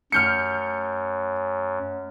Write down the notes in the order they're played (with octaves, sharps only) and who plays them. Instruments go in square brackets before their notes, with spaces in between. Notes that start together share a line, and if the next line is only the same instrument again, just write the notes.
[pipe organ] F#2 [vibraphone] A3 C#5 [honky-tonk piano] F6 G6 C#7